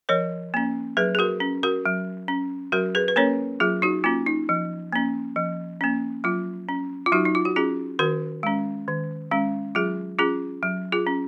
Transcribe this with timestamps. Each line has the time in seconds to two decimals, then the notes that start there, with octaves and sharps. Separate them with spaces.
0.09 F3 A#4 C#5
0.54 A#3 C#4
0.97 F#3 G#4 B4
1.15 G#4
1.19 F#4 A#4
1.40 C#4
1.63 F#4 A#4
1.85 F#3
2.28 C#4
2.72 F#3 F#4 A#4
2.95 G#4 B4
3.08 B4
3.16 A#3 C#4 A#4 C#5
3.60 F#3 F4 G#4
3.82 D#4 F#4
4.04 A#3 C#4 F4
4.26 D#4
4.49 F3
4.93 A#3 C#4
5.36 F3
5.81 A#3 C#4
6.24 F#3 F4
6.69 C#4
7.06 F4
7.12 F#3 D#4 F#4
7.25 D#4
7.35 F4
7.45 F#4
7.56 C#4 F4 G#4
7.99 D#3 F#4 A#4
8.43 G#3 C#4
8.88 D#3
9.31 G#3 C#4
9.75 F#3 F4 G#4
10.19 C#4 F4 G#4
10.63 F#3
10.92 F4 G#4
11.07 C#4